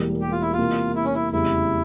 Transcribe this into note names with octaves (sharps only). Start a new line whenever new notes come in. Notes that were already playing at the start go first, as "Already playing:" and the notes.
Already playing: E1 E2 E3 G3 A#3
G4
F4
E4
F4
C3 E3 A#3
E4
C#4
E4
F1 E2 C#3 G3 E4